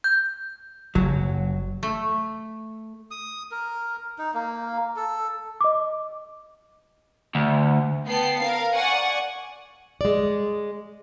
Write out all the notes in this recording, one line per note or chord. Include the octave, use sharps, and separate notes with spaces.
G6
F#1 F#3
A3
D#6
A#4
D#4
A#3
A4
D#5 D6
D2
B3 G5 A5 C7
A#4 F5
D5 F#5 G#5 C#6
G#3 D5